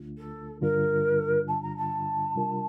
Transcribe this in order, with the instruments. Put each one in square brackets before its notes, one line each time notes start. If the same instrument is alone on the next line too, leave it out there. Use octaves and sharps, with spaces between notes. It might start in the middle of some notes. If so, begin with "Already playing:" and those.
Already playing: [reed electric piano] D2 D3 A3 D4 F4
[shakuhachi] A4
[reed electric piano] G2 D3 G3 D4 F4 [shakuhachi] A#4
[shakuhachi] A5
A#5
A5
[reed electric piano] C3 G3 D4 F4 A#4